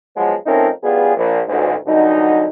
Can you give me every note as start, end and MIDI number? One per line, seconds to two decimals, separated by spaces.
0.16 0.35 53
0.16 0.35 54
0.16 0.35 56
0.16 0.35 59
0.46 0.69 53
0.46 0.69 57
0.46 0.69 60
0.46 0.69 61
0.46 0.69 63
0.46 0.69 70
0.83 1.14 33
0.83 1.14 55
0.83 1.14 59
0.83 1.14 65
0.83 1.14 68
1.17 1.41 34
1.48 1.73 33
1.48 1.73 38
1.48 1.73 44
1.87 2.47 36
1.87 2.47 50
1.87 2.47 54
1.87 2.47 63